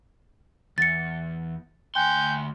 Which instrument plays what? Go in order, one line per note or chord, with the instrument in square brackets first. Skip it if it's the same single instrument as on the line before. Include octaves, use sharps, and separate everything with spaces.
[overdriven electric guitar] E2 [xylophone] A6 C#7
[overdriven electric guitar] D2 C6 [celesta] G5 G#5 F#6 [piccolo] G6